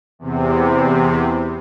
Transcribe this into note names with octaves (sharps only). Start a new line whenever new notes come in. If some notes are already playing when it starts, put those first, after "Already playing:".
E2 C3